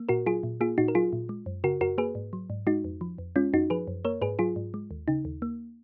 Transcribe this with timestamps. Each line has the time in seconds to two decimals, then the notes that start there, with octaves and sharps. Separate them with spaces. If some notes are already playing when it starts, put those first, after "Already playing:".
Already playing: A#3
0.09 A#2 F#4 A#4
0.26 F#3 F4 G#4
0.43 A#2
0.61 A#3 F4 G#4
0.78 A#2 D#4 F#4
0.88 A#4
0.95 F#3 F4 G#4
1.13 A#2
1.29 G#3
1.46 F#2
1.64 C#3 F#4 A#4
1.81 F#2 F#4 A#4
1.98 A#3 G#4 B4
2.15 G#2
2.33 F#3
2.50 G#2
2.67 G#3 D#4 F#4
2.84 F2
3.01 F3
3.18 F2
3.36 G#3 C#4 F4
3.53 F#2 D#4 F#4
3.70 F3 G#4 B4
3.88 F#2
4.05 A#3 A#4 C#5
4.21 G#2 G#4 B4
4.39 F#3 F4 G#4
4.56 G#2
4.74 G#3
4.91 D#2
5.08 C#3 D#4
5.25 D#2
5.42 A#3